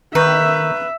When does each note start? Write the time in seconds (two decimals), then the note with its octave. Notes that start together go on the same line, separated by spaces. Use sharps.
0.15 D#3 B4 E5 A#5 C#6 G6